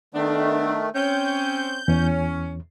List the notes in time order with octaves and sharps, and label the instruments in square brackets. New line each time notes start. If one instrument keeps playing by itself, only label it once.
[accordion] D#3 A3 [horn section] B3 D4
[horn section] C4 C#4 [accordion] G6
[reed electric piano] E2 [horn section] C#4